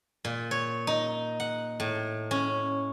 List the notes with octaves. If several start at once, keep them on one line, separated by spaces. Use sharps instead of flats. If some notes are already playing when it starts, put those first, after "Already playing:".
A#2
C#5
D#4
F#5
A2
C#4